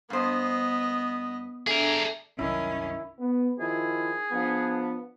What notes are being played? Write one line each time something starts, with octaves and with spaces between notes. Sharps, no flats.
G2 B3 C5 D#5
A3 D4 G#4 A#4
C2 F#2 D#3 C#4 E4
B3
D#3 F3 E4 G#4
F3 B3 D4